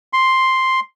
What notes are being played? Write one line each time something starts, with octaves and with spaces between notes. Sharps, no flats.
C6